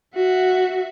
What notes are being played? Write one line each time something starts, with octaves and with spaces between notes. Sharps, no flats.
F#4 E5